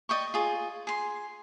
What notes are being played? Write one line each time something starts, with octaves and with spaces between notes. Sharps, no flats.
D5 D#5 G5 C#6
F4 G#4
G#4 C6